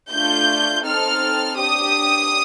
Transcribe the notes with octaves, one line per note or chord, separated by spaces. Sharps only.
A3 D4 F4 G6
C4 D#4 A4 F6
D4 G4 D#6